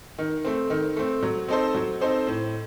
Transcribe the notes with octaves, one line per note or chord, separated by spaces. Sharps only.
D#3
A3 C4
D#3
A3 C4
F#3
C4 D#4 A4 C5
F#3
C4 D#4 A4 C5
A2